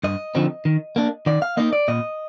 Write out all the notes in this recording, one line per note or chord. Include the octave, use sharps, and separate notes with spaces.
G2 D#5
D3 F3 C4 D#4
D#3
A#3 D4
D#3 D5
F5
A#3 D#4 D#5
D5
A#2 D#5